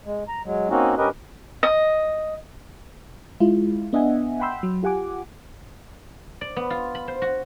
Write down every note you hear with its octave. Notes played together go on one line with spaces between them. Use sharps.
G#3
A#5
F#3 G#3
A#3 C4 C#4 D#4 F#4
G2 C#4 G4 A#4 B4 D#5
D#5
G#3 E4 F4
B3 D4 D#5 E5 F#5 G#5
F#5 G5 B5 C6 E6 G6
F#3
F4 G4 F#5 G#5 D6
D5
B3
F4
B5
C5
F#4